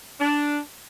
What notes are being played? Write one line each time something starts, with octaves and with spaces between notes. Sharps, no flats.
D4